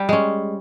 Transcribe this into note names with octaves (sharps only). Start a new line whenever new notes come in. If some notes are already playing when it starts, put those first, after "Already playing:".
Already playing: G3 G4
G#3 C#4